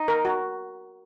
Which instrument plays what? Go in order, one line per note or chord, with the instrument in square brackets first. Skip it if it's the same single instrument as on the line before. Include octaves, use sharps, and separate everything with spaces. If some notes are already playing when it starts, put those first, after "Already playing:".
Already playing: [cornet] D#4
[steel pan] A#4
F#4